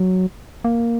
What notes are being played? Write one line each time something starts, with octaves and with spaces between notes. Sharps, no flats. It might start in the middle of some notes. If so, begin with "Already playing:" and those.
Already playing: F#3
A#3